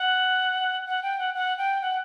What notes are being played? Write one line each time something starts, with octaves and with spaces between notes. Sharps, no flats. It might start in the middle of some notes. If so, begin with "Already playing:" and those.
Already playing: F#5
F#5
G5
F#5
F#5
G5
F#5